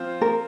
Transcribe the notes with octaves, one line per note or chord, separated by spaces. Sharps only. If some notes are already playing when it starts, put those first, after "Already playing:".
Already playing: F3 C4 F4 C5
A#4